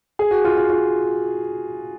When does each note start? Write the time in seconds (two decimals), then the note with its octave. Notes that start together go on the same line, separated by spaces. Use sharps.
0.19 G#4
0.31 F#4
0.45 F4
0.57 F4
0.69 F4